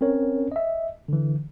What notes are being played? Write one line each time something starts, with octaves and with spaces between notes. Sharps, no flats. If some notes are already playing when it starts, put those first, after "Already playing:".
C4 C#4 A#4 C#5
D#5 E5
D3 E3